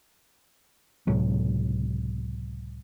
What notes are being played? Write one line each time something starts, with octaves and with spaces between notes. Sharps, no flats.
C#2 A2 C3 F#3